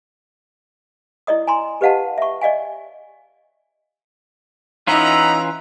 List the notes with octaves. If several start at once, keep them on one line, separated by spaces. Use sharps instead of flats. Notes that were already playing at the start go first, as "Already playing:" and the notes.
E4 D5 D#5 D#6
G#5 A#5 C6
G4 B4 D#5 F5 F#5 A5
E5 C#6
D5 D#5 F5 G#5
E3 C#4 D#4 F4 F#5 A#5 B5 E6